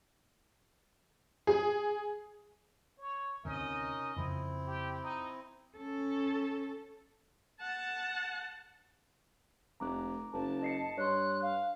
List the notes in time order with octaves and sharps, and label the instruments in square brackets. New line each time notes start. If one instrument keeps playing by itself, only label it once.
[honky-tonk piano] G#4
[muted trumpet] C#5
[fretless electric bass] D2 C3 [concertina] C#4 D#4 A#4 [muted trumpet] D#5
[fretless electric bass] F2 C#3 F3 [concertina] C4 E4
[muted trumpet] G4
D#4
[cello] C#4 A4
[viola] F#5 A5
[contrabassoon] F1 [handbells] A#5 D6 F#6
[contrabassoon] F#1 [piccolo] A5
[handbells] D#5 C7 C#7
[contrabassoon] G2 [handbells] C#5 C6 [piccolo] F#6
[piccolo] F5